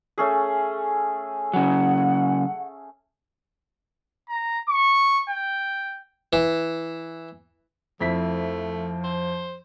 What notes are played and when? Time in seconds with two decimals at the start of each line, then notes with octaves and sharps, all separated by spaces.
0.18 A3 C#4 G#4
1.53 C#3 F#3 F#5
4.29 A#5
4.69 C#6
5.30 G5
6.33 E3
8.01 F2 F3 A3 E4 B6
9.04 C5